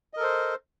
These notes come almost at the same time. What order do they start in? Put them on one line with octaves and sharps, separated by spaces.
D#5 A#4 A4 C5